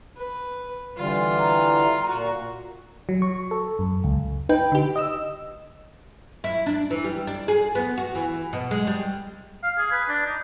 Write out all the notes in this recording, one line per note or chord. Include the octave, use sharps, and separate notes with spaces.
B4
D3 E3 G3 F4
A#5
A#2 F#4
F#3
C#6
A4
F#2
C#2
D#4 B4 G5
D3 G4
D#5 E6
E4
D4
E3
G3
D4
G#4
B3
F#4
E3
B2
G#3
G3
F5
G#4
B4
D4
D#4